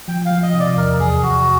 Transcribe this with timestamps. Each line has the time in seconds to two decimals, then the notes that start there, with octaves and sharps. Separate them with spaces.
0.08 F3 G5
0.25 F5
0.31 F3
0.43 D#5
0.54 C3
0.60 D5
0.77 E2 A#4
1.00 E2 G#4
1.23 E2 F#4